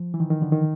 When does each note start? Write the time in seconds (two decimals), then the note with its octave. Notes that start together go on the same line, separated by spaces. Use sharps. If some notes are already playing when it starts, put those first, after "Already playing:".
Already playing: F3
0.14 E3
0.20 D#3
0.30 D#3
0.42 D3
0.52 D#3